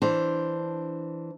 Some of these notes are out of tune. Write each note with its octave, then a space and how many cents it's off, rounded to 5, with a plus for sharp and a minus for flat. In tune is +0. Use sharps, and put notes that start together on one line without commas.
E3 +0 D4 +0 C5 +0